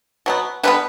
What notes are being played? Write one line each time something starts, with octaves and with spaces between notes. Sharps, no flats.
B2 F#3 B3
D3 G3 B3 B4